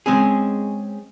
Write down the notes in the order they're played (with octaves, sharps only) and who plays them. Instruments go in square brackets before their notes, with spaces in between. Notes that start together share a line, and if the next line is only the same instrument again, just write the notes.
[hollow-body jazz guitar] G#3 C4 C#4 G#4